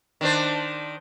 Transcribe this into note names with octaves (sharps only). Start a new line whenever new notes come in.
D#3 D4 C5